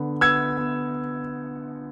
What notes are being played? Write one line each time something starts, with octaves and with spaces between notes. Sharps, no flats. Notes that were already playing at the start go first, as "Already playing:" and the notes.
Already playing: D3 B3
B3 E6 G#6
B3